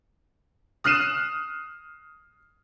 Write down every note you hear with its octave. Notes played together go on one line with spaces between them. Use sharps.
D#6 F6 F#6 C7 D#7 E7